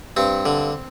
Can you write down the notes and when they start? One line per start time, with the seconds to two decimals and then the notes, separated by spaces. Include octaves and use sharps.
0.17 G2 C4
0.46 D3